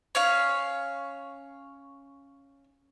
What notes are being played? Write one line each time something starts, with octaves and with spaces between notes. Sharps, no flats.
C#4 C#5 F5